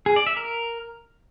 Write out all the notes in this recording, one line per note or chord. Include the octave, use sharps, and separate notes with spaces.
G#4
D5
E5
A#4